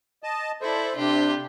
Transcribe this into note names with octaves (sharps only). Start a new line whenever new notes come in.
D#5 A5
E4 A4 C5 D5
C3 D4 F4 G4